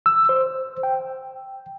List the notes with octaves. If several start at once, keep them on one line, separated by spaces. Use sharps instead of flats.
E6
C5
G5